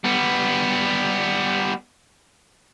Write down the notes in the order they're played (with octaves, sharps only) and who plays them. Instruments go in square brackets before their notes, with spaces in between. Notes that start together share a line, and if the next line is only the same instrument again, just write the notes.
[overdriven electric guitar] G3 B3